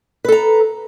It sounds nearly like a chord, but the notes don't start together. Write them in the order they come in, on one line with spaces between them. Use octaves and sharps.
B4 A4 A#5